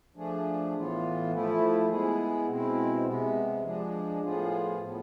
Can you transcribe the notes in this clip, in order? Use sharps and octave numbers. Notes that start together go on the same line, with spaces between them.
F3 A3 D4 G#4
A2 E3 B3 F4
F3 A3 E4
G#3 B3 E4 G#4
B2 G#3 C4 E4
C3 G#3 B3
F3 G#3 D4 G#4
A2 F3 B3 F4 G#4
A2 F3 B3